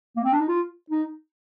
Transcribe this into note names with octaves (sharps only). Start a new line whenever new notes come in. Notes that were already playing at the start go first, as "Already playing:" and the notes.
A#3
C4
D4
D#4
F4
D#4